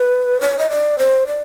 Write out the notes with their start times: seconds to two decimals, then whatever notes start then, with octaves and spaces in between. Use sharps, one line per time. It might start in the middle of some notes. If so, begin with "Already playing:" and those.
Already playing: B4
0.41 C#5
0.59 D#5
0.70 D5
0.99 C5
1.27 D5